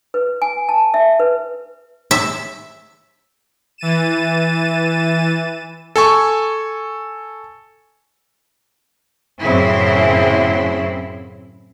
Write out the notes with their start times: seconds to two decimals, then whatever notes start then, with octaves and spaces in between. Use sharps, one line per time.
0.14 B4
0.42 G#5
0.69 A5
0.94 E5
1.20 B4
2.11 E5
3.78 E3 A6 D#7 E7
5.96 A4 G#5 C#6
9.41 F#2 A2 C#3 C4 E4